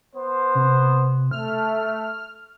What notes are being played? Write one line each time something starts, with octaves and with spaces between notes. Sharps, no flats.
B3 C5
C3
A3 F6